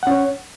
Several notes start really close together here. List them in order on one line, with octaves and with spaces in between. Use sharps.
F#5 C#4 C#5